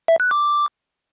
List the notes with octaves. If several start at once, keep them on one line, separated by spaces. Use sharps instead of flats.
E5
F#6
D6